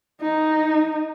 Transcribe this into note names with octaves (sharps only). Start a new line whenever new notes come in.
D#4